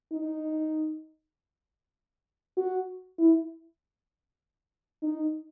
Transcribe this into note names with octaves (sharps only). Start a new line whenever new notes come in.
D#4
F#4
E4
D#4